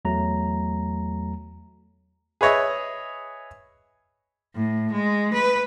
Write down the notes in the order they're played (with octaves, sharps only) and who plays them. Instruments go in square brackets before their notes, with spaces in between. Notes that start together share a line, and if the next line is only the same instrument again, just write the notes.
[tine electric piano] E2 F#3 A3 A#5
[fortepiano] G#4 B4 C#5 D#5 E5
[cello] A2
G#3
B4